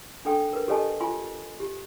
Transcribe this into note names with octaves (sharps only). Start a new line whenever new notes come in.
D4 A4 G5
A#4 B4
G4 A4 C#5 D#5 G#5 A5
F4 G#5 C6
G4